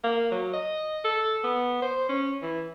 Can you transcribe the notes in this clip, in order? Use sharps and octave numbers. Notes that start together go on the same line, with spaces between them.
A#3
F#3
D#5
A4
B3
C5
C#4
E3